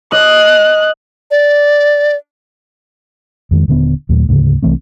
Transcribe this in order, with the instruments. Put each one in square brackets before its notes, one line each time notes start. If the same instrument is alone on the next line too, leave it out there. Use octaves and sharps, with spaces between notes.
[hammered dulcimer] D#5 [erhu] F#6
[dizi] D5
[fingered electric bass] F2 D#3 G#3
D#1 D3 A#3 B3
D#2 A#2 F#3 A3
D2 G#2 C#3
C2 E3 A3 C4